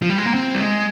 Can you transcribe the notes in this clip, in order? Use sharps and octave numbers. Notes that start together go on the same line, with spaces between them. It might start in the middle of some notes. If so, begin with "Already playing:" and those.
F3
G3
G#3
A#3
C4
G3
G#3